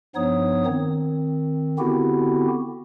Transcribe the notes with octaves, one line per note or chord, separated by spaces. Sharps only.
G2 F3 B3 D#4 C#5 D#6
D#3 C4
D3 B3 C4 E4 F#4 G4